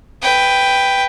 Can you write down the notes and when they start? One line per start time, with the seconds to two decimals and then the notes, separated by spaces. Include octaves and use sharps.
0.22 B4 G5